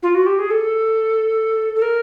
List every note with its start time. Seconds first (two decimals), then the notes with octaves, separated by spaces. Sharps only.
0.03 F4
0.15 F#4
0.26 G4
0.39 G#4
0.50 A4
1.75 A4
1.82 A#4